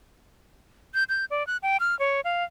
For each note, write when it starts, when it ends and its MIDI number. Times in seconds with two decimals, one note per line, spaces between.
0.94 1.04 91
1.09 1.25 91
1.31 1.46 74
1.47 1.57 90
1.63 1.77 79
1.80 1.98 89
1.99 2.21 73
2.24 2.44 77